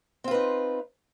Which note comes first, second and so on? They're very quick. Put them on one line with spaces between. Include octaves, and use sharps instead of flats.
C4 F4 B4 D#4